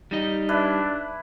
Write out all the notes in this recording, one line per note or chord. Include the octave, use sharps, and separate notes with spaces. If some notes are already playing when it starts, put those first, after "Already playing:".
G3 D#4 D#5
D4 E4 B4